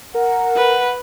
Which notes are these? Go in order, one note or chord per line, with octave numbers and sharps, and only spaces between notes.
A#4 F#5
B4